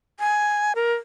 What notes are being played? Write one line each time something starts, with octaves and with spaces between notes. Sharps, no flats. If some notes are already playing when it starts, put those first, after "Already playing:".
G#5
A#4